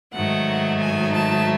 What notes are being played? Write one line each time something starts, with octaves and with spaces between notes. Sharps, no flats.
G#2 D#3 F#3 A3 F#5
G#5
A5